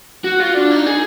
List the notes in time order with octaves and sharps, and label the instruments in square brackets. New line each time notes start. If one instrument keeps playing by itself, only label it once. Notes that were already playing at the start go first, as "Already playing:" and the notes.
[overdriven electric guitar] F#4
F4
D4
D#4
G#4